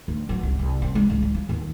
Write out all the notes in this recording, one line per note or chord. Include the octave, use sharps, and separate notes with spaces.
D2
F#3
C2
C2
C4
G#3
C#2
G3
F3
D#2